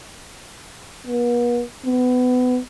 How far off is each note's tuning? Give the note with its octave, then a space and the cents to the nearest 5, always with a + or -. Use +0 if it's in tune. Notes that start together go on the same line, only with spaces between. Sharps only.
B3 -45
B3 +25